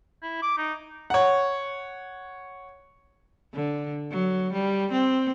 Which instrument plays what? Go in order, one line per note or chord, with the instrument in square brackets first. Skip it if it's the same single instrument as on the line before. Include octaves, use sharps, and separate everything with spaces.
[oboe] E4
D6
D#4
[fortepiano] C#5 F#5
[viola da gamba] D3
F#3
G3
C4